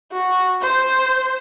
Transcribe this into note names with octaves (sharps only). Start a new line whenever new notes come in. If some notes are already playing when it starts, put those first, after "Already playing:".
F#4
C5